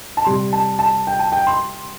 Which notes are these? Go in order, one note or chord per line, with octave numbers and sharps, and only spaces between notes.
A5
C3 G3 C6
A5
A5
G5
A5
G5
C6